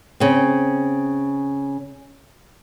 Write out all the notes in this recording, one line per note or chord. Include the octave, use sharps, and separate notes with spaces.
C#3 C4